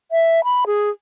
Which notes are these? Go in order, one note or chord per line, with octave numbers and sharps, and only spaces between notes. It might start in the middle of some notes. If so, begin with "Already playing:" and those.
E5
B5
G#4